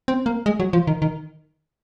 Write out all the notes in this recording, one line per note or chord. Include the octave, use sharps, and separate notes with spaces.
C4
A#3
G#3
F#3
F3
D#3
D#3